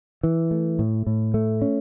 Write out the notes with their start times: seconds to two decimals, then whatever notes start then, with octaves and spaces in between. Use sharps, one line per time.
0.23 E3
0.51 A3
0.79 A2
1.07 A2
1.34 A3
1.62 C#4